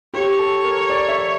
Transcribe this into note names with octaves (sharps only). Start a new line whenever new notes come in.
G4 C#5
A4
A#4
D5
E5